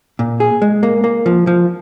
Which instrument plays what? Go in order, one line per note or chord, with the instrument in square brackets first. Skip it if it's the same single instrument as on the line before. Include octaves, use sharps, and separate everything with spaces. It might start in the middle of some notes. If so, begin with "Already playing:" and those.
[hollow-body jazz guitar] A#2
G#4
G#3
A#3
A#3
F3
F3